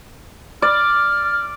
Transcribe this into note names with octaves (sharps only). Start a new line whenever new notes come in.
D5 F6